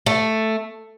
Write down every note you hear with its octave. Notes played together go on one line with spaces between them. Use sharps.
A3